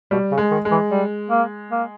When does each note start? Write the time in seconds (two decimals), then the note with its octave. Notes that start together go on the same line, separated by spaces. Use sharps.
0.11 B2 G3
0.32 C#3
0.38 G#3
0.51 D#3
0.65 G#3
0.71 E3
0.91 G3
1.30 A#3
1.71 A#3